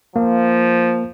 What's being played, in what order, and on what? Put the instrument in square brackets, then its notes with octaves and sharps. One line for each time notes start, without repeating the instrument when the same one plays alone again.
[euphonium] F3 [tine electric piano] A#3